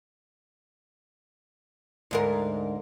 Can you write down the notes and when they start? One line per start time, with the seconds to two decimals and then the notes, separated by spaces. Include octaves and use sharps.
2.11 D2 G#2 A#4